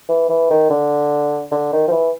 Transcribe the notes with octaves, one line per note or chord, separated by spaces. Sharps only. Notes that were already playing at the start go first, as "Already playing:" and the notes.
E3
E3
D#3
D3
D3
D#3
F3
E3